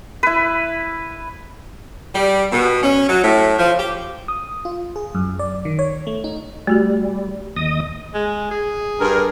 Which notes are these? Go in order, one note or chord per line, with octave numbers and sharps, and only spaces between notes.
E4 B4
G3
B2
C#4
F#3
A2
F3
G4
D#6
F4
G#4
F#2
D5
D#3
C#5
A3
D#4
G3 A3 F#4 G4
D#2 D#5 D#6
G#3
G#4
G2 A#4